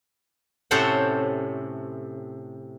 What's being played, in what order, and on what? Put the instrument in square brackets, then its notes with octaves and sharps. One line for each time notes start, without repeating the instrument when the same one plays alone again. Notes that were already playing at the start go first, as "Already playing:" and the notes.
[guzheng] A2 C3 C#4 A4 C5 F#5